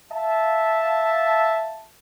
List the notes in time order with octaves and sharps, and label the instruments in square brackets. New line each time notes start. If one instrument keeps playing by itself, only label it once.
[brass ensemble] E5 F5 A5